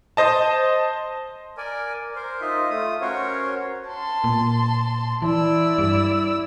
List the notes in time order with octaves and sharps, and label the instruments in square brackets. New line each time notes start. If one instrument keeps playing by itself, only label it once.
[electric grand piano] C5 D#5 A5
[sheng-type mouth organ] A#4 D5 G#5
A#4 C5
D#4 F4 D#5 E5
A3 F4 D#6
C#4 F#4 A#4 C5 C#5
[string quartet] A5 C6
[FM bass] A#2
[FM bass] E3 [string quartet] E4 D5 E6
[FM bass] G2